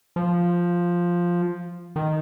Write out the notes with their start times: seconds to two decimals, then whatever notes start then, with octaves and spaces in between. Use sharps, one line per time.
0.16 F3
1.96 D#3